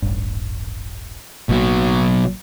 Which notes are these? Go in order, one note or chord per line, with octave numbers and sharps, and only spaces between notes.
D#1 A1 G2
A1 B2 F#3 A#3